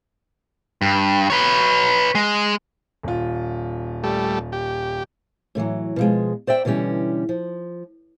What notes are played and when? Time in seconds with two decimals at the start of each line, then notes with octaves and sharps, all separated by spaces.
0.82 G2
1.30 B4 C#5
2.15 G#3
3.03 D#1 F4
4.04 G3 A3
4.52 G4
5.55 A2 D3 E3 F#3
5.96 B2 F3 G#3
6.47 C5 D5 E5 G5
6.65 B2 D3 E3 G3 C#4
7.29 F3